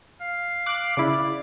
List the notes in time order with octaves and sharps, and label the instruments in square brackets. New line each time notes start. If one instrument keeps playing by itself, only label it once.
[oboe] F5
[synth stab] D6 F#6
[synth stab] C#3 E4 [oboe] D5